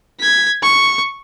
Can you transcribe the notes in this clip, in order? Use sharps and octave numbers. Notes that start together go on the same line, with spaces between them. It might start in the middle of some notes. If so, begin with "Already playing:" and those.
G#6 B6
C#6